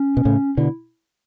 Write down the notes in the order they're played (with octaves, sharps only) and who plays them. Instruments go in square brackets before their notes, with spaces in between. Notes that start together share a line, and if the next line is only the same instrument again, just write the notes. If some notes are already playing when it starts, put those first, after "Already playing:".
Already playing: [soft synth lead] C#4
[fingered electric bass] B2
A2 C#3
[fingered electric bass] B2 D3 [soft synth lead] E4